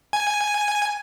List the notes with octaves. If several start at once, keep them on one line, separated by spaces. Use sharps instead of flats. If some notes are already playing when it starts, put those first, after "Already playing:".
G#5